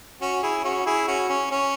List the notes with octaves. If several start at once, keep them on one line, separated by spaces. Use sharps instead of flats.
C#4 F#4
E4 G#4
C#4 F#4
E4 G#4
C#4 F#4
C#4
C#4